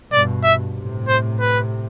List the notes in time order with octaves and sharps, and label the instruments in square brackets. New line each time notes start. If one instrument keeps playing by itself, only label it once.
[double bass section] G2 B2 [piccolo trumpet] D5
[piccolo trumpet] E5
[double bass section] A2 C3
[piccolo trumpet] C5
B4